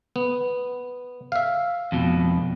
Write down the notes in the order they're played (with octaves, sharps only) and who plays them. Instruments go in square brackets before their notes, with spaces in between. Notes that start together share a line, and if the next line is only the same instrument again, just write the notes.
[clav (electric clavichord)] B3
E5 F5
[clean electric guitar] F2 B2